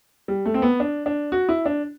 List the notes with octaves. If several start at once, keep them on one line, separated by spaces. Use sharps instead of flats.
G3
A3
C4
B3
D4
D4
F#4
E4
D4